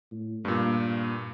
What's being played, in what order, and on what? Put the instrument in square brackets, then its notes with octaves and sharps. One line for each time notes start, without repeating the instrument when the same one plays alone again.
[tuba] A2
[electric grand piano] G2 A#2 [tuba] A#3